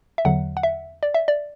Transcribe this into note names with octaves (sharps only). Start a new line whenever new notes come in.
E5
E2 D3 F#3 F#5
F#5
E5
D5
E5
D5